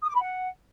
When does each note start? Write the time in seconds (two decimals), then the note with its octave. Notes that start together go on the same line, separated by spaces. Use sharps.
0.02 D#6
0.08 D6
0.15 B5
0.21 F#5